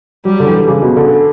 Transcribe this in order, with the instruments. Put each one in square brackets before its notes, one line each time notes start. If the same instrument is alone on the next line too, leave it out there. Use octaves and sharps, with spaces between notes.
[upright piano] F#3 [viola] G3
[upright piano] D3
E3
C#3
B2
D3